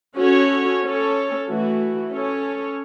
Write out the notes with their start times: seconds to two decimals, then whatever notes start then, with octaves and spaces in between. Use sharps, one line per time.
0.18 C#4 F#4 A4 C#5
0.83 C#4 A4 C#5
1.47 E3 A3 F#4
2.12 C#4 A4 C#5